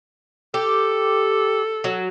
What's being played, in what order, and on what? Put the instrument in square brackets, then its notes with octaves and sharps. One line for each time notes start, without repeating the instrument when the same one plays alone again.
[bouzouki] G4 [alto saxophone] A4
[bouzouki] F#3